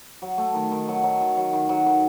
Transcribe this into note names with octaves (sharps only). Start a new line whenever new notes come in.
F#3
A3
D#3
D#3
F#3
F#3
D#3
F#3
D#3
F#3
D#3